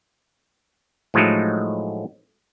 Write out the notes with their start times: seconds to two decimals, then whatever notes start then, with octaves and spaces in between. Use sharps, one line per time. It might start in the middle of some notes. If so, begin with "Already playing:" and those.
1.14 A2 F3 F#3 G#3 A3 D#4